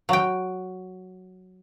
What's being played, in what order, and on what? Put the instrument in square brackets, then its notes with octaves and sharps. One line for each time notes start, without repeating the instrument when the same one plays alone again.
[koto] F#3 G5